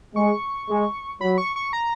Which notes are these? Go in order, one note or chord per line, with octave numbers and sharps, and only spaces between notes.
G#3 C#6
G#3
F#3 B5
C#6
C#6
A#5